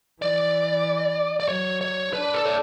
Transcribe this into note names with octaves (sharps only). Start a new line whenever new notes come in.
E3 D5
D5
F#3 C#5
C#5
D4 B4
A4
C#5